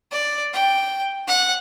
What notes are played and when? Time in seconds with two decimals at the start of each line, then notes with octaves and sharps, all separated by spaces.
0.12 D5
0.53 G5
1.28 F#5